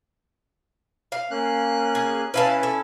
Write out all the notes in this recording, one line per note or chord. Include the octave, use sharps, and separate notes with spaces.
F5
A#3 C#4 F#6
G#4
C#4 E4 B4 F5 A5
A4